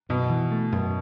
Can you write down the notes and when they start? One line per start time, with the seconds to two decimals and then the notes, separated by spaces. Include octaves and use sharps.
0.09 F#2 B2
0.30 E3
0.51 A3
0.72 F#2